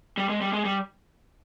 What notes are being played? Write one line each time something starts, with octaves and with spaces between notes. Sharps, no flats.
G3
G#3
G3
G#3
G3